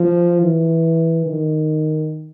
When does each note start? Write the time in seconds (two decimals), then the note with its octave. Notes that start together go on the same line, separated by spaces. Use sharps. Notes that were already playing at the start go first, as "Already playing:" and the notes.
Already playing: F3
0.42 E3
1.26 D#3